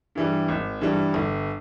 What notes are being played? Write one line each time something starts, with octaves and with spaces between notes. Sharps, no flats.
G2 E3 G3
G#1
G2 E3 G3
G1